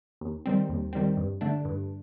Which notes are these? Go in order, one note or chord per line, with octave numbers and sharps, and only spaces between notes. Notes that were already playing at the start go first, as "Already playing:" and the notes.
D#2
D#3 G3 C4
D#2
D#3 G3 C4
G2
D3 A3 D4
G2